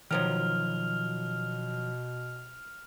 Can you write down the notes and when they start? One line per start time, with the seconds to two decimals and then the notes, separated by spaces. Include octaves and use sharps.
0.11 B2 D#3 F3 F#3 F6 F7